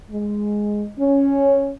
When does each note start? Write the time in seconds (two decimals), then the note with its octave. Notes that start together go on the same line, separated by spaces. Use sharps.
0.11 G#3
0.99 C#4